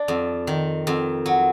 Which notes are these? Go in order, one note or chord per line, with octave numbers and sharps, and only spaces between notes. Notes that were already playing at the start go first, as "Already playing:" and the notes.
Already playing: D4
F2
D#3
F2
F#3